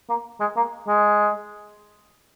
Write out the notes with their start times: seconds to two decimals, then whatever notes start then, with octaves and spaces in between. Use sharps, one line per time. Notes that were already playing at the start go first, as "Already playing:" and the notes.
0.09 A#3
0.40 G#3
0.56 A#3
0.88 G#3